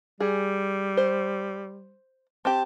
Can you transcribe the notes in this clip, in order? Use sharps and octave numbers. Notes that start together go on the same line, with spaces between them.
G3 G#4
C5
C4 G4 A5